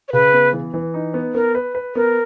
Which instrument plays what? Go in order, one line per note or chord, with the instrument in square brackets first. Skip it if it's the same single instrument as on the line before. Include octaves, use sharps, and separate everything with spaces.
[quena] C#5
[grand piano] C#3 [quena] B4
[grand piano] B3
E3
E3
D#4
B3
[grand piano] B3 [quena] A#4
[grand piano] B4
B4
[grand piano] B3 [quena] A#4